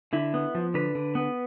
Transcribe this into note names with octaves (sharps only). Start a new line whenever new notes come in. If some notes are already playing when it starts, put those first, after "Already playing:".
D3 E4
B3
F3
D3 B4
D3
B3